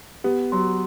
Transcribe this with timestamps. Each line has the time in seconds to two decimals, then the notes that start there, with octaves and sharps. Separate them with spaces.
0.24 B3 G4
0.52 F#3 C6